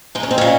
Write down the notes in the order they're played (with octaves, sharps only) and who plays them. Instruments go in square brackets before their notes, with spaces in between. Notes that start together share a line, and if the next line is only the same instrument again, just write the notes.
[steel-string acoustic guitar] G#3 D#4
C#4
C4
A#2 C#4